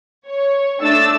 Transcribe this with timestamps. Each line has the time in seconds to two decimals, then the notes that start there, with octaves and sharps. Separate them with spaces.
0.27 C#5
0.81 A3 D4 E6 A6